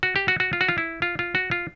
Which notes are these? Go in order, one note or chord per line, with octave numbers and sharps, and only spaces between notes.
F#4
G4
F#4
F#4
F4
F#4
F4
E4
F4
F4
F#4
F4